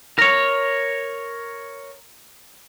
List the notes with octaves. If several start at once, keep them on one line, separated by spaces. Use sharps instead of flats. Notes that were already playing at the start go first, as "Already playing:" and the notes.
A#4 C#5